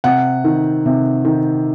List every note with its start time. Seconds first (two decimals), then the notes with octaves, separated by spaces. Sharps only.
0.04 C3 F#5
0.44 D#3
0.86 C3
1.25 D#3